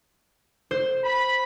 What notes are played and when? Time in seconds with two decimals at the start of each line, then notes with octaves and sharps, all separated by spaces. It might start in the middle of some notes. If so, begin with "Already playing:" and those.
0.71 C5
1.04 B5